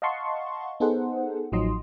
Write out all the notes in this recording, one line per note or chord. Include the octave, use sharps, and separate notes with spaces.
D#5 F5 F#5 A5 C6 C#6
B3 D#4 G#4 A4 C5 F#5
A1 F3 F#3 D#4 D#5 C6